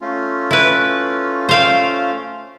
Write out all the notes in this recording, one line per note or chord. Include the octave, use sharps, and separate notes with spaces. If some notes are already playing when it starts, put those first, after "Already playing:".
A3 C#4 F4
E4 B4
C5 F5 G5